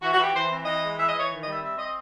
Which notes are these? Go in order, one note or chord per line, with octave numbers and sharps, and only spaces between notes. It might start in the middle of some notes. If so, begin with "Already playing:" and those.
E3 F#4
F#4
E3 G4
E3 C5
C4
E3 D#5
G#3
E3 E5
D#5
E3
C#5
D#3
D#5
G3 E5
C4 E5
C4 D#5